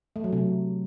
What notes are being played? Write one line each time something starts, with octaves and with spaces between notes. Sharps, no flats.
A3
F#3
C3